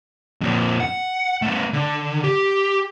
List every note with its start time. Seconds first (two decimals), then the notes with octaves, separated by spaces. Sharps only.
0.41 F2 A#2
0.80 F#5
1.42 A3 B3
1.73 D3
2.24 G4